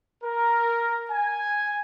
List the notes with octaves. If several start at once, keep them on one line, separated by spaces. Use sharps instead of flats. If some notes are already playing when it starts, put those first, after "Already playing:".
A#4
G#5